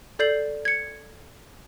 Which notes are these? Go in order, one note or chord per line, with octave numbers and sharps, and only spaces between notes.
A4 D5 G6 C7 F#7
G#6 C#7